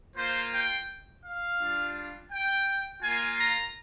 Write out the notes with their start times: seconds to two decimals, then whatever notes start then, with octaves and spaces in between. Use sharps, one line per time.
0.16 A#3 F4 C5
0.53 G5
1.24 F5
1.59 G3 D4 F4
2.31 G5
3.02 A#3 F4 G#5
3.39 A#5